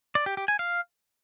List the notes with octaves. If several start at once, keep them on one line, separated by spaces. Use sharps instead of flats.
D5
G4
G4
G#5
F5